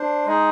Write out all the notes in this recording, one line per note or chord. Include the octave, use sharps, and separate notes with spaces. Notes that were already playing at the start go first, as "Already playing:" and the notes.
Already playing: D4 C5
G#3 D#4 G#4